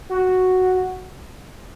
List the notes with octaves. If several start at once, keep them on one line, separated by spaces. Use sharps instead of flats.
F#4